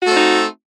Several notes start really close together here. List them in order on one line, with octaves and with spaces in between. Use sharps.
F#4 A3 C4 D#4